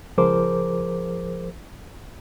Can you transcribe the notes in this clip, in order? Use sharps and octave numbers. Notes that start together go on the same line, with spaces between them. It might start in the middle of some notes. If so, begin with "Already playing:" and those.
C#2 F3 G#4 A#4 C5 D6